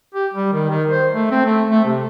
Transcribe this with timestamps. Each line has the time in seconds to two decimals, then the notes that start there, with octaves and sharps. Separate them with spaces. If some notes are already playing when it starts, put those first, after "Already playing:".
0.15 G4
0.34 G3
0.53 D#3
0.70 D#3
0.91 C5
1.13 A3
1.31 C4
1.45 A3
1.71 A3
1.85 C3